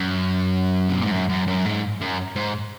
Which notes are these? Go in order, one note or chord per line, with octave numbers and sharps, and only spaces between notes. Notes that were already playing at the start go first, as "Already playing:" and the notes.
Already playing: F#2
C3
A#2
G#2
F#2
F#2
F#2
G#2
F#2
G#2